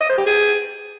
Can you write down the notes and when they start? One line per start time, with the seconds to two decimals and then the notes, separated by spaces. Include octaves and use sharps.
0.01 D#5
0.09 C5
0.18 G4
0.26 G#4